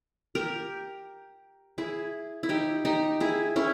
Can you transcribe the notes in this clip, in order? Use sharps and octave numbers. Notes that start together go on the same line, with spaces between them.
G4 A#4
E4 G#4
E4
D#4 G4
D#4 G4
E4 G#4
C#4 E4